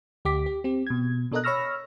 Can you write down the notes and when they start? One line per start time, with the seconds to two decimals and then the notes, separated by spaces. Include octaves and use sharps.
0.25 D2 G4 D6 B6
0.46 G4
0.64 C4 G4
0.87 B2 G#6
1.32 B2 D4 A4 A#4 D#5 F#6
1.44 C#5 B5 C#6 E6 F6 A#6